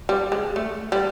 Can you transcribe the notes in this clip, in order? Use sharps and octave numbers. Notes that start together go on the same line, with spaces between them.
G3
G#3
A3
G3